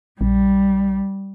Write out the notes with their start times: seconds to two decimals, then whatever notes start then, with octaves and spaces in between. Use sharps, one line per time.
0.21 A#1 G3